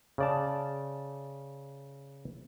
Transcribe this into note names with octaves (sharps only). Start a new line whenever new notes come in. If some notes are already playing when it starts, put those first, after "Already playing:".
C#3 D5 A5